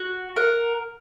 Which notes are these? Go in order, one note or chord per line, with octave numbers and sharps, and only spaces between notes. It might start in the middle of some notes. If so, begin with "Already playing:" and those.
Already playing: F#4
A#4 F#5